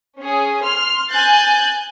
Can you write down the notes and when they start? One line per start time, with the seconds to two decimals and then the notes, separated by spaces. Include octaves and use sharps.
0.17 C#4 G#4
0.62 C6 F6
1.10 G#5 F#6 G6 A6